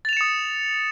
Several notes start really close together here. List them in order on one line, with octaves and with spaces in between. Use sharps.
A6 F7 E7 C#7 D#6